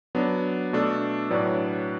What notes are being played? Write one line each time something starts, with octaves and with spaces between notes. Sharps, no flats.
F#3 B3 D4
B2 A3 D4 A4
A2 F#3 D4 B4 D5